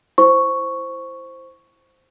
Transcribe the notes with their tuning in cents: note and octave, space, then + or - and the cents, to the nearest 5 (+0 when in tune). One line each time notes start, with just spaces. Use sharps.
E4 +0 C5 +0 C#6 +0